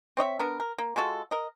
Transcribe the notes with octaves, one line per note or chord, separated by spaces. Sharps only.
C4 C#5 D#5 E5
B3 D4 A#4
A#4
A#3
G#3 F4 F#4 A4
A#4 D#5